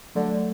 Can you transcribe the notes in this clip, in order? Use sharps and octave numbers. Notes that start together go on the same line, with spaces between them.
D3 F#3 A3